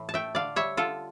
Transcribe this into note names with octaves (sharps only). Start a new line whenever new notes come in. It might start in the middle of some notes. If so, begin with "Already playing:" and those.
Already playing: A2 E3
A5
A3 E5 G5
D3 D5 F5
G3 C#5 E5
D3 F4 A4